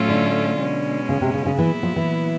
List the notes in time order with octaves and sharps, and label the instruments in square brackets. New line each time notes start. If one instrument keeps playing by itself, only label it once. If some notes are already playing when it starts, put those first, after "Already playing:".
Already playing: [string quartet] A2 F#3 A3 C#4 F4
[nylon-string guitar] D3
[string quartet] B2 G#3 C#4
[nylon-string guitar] C#3
C3
C#3
C#3
[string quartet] A#2 F#3 B3 E4 [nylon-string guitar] E3
[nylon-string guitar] F3
E3